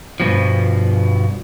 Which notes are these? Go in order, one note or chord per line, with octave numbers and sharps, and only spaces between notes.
G2 B2 F3